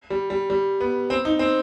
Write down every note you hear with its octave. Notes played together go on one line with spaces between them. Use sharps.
G3
G3
G3
B3
C4
D#4
C4